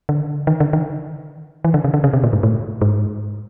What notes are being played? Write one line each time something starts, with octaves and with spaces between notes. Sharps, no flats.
D3
D#3
D3
D#3
E3
D3
C#3
D3
C#3
C3
A#2
G#2
A2
G#2